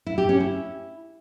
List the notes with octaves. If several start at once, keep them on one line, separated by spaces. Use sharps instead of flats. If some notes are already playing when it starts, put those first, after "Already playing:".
E4
G4
C#4
E4